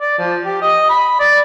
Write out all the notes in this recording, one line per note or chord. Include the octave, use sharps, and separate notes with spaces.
D5
F3
G4
D#5
B5
D5